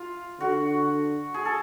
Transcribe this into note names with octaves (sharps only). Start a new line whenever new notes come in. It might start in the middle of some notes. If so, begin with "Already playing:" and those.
Already playing: F4
D3 F#4
G#4
A4